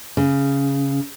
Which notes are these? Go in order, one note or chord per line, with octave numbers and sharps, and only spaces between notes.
C#3